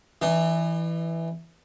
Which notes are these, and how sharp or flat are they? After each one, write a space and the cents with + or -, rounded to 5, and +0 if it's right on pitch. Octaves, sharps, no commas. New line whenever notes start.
E3 +0 D4 +45